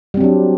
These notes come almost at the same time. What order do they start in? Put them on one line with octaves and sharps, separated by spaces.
G3 C4 F#3 D4